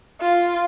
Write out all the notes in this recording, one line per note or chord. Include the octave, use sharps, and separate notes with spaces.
F4